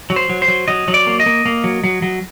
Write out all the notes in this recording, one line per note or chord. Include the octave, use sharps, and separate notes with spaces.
F#3
C5
F#3
C5
F#3
F#3 D#5
F#3
D5
A#3
D#5
A#3
A#3
F#3
F#3
F#3